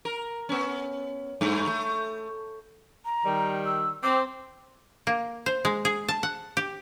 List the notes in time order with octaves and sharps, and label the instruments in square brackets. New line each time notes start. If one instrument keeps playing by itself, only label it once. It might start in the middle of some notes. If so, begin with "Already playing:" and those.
[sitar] A#4
B3 C#4
G2 A3
A3
[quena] A#5
[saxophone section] D#3 G3
[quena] E6
[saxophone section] C4 [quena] D6
[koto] A#3
C5
G#3
G#4
A5
F#5
G4